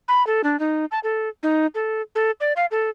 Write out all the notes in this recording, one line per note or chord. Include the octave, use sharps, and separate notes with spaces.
B5
A4
D4
D#4
A5
A4
D#4
A4
A4
D5
F5
A4